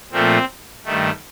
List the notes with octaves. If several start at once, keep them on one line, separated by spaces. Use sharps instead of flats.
A#2 F3 A3 C4
G2 D#3 A3